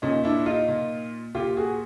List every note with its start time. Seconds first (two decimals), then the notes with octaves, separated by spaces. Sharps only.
0.02 A#2 C#4 D#4
0.24 D4 E4
0.46 D#4 F4
0.68 A#2
1.35 A#2 F4 G4
1.57 F#4 G#4